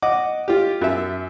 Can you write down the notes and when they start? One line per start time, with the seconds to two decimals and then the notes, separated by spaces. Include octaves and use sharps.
0.02 D#5 F#5 D6
0.48 F4 G4
0.81 F#2 E5